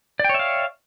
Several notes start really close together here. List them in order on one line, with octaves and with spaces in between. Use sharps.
D5 G5 C#5 E5 F5